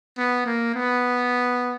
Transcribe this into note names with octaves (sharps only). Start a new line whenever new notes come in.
B3
A#3
B3